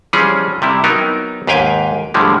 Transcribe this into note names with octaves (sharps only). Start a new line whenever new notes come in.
E3 F3 G3 C#4 G#4
C3 G3 E4
F#3 B3 D#4 A#4
D#2 G#2 B4 F5 G5 G#5
A2 D3 F3 G3 G#3